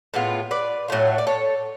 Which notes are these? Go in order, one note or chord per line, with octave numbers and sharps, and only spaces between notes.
A2 G#3 B3 F4
B4 D5
A2 F#3 A3 F4
D5
A4 C#5